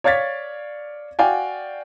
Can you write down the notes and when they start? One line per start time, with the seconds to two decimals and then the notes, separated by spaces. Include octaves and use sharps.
0.04 C#5 D5 F5 G#6 A6 B6
1.19 F#4 D5 F5 G5 G#5